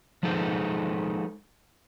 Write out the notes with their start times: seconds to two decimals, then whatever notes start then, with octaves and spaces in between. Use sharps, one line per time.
0.23 F3 G#3 D#4 A4 B4 C5